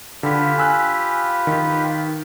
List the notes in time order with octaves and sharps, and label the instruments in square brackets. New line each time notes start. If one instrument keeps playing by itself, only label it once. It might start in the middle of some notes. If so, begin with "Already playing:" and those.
[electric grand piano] D3 [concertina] F4 G4 B4
[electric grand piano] G#5 E6 F#6
D#3